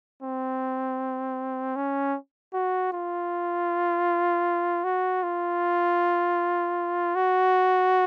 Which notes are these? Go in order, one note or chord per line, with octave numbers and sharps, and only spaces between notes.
C4
C#4
F#4
F4
F#4
F4
F#4